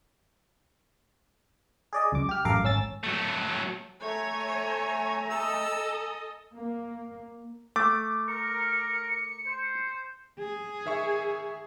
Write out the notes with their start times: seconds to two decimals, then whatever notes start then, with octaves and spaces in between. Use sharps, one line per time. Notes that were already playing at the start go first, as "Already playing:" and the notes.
1.93 G#4 D5 D#5
2.12 C#2 F#2 D6
2.29 G4 F6
2.45 A1 F#2 A4 A#4 F5 D6
2.64 G#1 C#4 E6 A6
3.04 F#3 A3
4.02 A3 C#5 G#5 A#5
5.29 A4 D#5 E6
6.53 A#3
7.76 A3 D6
8.27 A#4 C#7
9.46 C5
10.39 G#4
10.85 D#3 E5 C#6